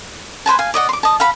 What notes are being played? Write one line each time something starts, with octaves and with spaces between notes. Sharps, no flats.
B4 C5 G#5 A5
F5 G#5
D5 D#5 F#5
C6 D6
D#5 A5
F5 F#5 B5